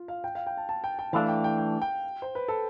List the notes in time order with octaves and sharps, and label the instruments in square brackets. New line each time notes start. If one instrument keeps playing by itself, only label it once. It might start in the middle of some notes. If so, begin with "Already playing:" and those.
Already playing: [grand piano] F4
F5
G5
F5
G5
A5
A5
G5
G5
[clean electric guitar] E3 A3 D4 [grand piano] F5
[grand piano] G5
G5
G5
G5
C5
B4
A4